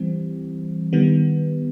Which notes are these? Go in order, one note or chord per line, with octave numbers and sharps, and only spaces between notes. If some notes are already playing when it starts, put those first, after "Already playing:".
Already playing: E3 G3 C4
D#3 G3 B3